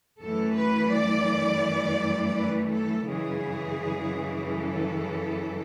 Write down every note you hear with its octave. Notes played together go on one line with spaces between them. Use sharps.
F#2 E3 A3 A4
B4
D5
B4
A4
F#2 C#3 E3 G#3 G#4
A4